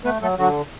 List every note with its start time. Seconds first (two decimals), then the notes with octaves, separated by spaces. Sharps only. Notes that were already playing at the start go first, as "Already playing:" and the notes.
0.05 A3 B3 B4
0.22 F#3 A3 A4
0.38 D3 F#3 F#4